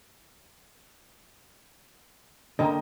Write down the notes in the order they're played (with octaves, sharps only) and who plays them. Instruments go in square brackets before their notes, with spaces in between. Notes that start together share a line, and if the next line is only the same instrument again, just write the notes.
[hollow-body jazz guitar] D3 A#3 [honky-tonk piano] D#5 G5 A#5